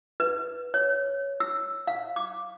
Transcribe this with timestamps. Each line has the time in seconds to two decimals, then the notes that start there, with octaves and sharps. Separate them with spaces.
0.20 B4
0.74 C#5
1.40 E6
1.87 F5
2.16 D6